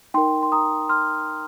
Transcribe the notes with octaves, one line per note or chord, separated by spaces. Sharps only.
D#4 A#4 G5 C6
C6
A#5 D#6
C6 F6